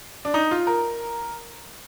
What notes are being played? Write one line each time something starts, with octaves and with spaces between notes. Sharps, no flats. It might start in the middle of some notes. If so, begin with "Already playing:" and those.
D4
D#4
F4
A#4